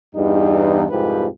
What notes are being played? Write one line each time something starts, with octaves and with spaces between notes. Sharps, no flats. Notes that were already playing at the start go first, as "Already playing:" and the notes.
E2 G2 D#4
C2 F2 G#2 F3 G4 B4